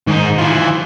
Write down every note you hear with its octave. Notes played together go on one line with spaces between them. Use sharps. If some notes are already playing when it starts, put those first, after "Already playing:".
G#2 D#3 D#4
E3 F4